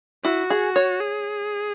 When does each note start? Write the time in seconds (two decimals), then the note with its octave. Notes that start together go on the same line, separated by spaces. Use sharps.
0.24 E4 F#4
0.50 G#4
0.76 C#5
1.01 G#4